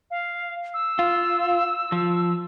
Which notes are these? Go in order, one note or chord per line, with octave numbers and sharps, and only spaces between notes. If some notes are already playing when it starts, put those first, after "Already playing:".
F5
E6
F4
F3